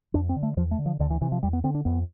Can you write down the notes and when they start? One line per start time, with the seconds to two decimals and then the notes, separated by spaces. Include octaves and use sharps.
0.14 F2 D4
0.29 C4
0.36 D3
0.43 A3
0.57 E2 F3
0.71 A3
0.78 D3
0.86 F3
0.99 D2 D3
1.10 E3
1.21 C3 E3
1.32 F3
1.43 E2 G3
1.53 B3
1.64 D3 C4
1.75 D4
1.85 F2 B3